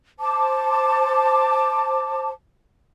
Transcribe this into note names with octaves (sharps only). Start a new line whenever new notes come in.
C5 A5 D6